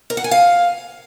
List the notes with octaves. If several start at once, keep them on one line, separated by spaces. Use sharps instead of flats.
A#4
F#5
G#5
F5